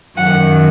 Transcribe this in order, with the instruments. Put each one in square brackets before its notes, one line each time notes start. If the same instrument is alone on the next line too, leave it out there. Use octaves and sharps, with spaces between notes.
[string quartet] F#2 D#3 F#3 F#5